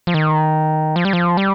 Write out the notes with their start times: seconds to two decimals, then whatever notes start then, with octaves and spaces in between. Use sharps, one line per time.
0.07 F3
0.14 D#3
0.96 F3
1.05 G3
1.13 F3
1.37 G3